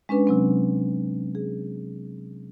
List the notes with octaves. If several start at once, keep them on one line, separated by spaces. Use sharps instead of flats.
G#3 C#4 D4 B4
C3 F#3 C4
G#4